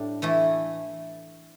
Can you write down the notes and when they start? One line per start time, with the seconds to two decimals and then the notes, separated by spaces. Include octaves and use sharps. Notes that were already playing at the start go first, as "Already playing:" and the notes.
Already playing: A2 G3 D4
0.22 E3 A3 E4